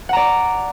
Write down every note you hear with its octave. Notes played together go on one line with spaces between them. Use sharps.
D5 F#5 A#5